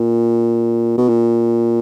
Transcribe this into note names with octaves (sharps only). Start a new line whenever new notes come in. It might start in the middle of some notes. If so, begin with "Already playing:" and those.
Already playing: A#2
B2
A#2